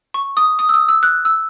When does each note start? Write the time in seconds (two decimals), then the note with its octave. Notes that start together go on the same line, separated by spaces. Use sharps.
0.14 C#6
0.37 D#6
0.59 D#6
0.69 E6
0.74 D#6
0.89 E6
1.03 F#6
1.25 E6